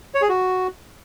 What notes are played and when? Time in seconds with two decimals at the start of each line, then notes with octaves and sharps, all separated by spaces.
0.15 C#5
0.22 G#4
0.29 F#4